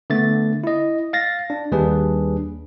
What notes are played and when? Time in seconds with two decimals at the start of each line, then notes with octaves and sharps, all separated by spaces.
0.10 D3 A3 B3 A6
0.64 E4 D#5
1.13 F5 A6 A#6
1.50 D4
1.72 D#2 G3 D4 G#4 B4